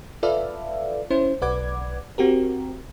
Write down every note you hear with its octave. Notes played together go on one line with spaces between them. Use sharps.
F4 A4 B4 D5 E5 F5
C#4 E4 C5
B1 B4 D5 F#5 D6 G#6
C4 F#4 G4 A#4